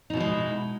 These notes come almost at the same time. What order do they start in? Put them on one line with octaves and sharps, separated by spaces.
D#4 B2 E4 G#3